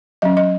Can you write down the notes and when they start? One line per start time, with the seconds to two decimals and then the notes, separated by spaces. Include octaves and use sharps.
0.22 F#3 C#4 D#5
0.37 D#5